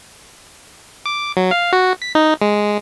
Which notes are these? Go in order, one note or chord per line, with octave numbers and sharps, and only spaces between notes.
D6
F#3
F5
F#4
B6
D#4
G#3